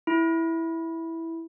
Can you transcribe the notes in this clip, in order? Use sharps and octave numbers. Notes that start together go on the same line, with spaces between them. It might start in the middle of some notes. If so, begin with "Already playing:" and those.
E4